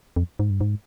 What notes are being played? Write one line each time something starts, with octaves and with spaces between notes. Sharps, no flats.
F2
G#2
G2
G#2